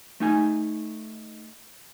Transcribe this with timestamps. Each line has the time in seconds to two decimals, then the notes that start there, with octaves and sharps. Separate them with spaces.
0.20 A3 D#4 G#5